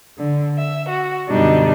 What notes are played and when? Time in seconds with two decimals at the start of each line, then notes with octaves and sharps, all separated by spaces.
0.18 D3
0.58 E5
0.89 F#4
1.29 F#2 B2 D3 G3 D4 D#4